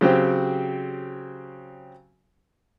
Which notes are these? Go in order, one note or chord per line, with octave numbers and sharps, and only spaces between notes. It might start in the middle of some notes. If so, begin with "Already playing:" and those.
C#3 F#3 C4 G4